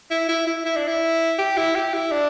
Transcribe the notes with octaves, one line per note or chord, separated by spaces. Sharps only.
E4
E4
E4
E4
D4
E4
G4
E4
G4
E4
D4